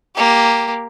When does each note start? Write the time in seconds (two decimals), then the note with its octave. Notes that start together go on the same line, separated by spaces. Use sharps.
0.15 A#3 G4